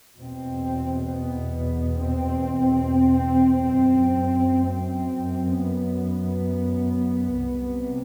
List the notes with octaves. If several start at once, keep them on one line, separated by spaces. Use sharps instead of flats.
E2 B2 C4
B3
C4
F#2
C4
B3
C2 C3